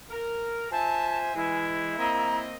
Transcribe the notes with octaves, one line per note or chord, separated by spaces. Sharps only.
A#4
F4 C5 E5 G#5 A5
E3 G#3 E4
A#3 C4 D#5 A#5